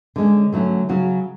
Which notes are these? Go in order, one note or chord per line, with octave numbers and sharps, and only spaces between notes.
D3 G#3 C#4
D3 F#3 A3 C#4
C#3 F#3 C#4 F#4